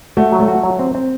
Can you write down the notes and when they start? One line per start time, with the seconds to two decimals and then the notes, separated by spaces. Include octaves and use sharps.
0.17 A3 F#4
0.32 F#3
0.40 A3
0.48 F#4
0.63 F#3
0.79 C4
0.95 C4